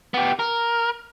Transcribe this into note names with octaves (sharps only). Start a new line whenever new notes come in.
B3 G4
A#4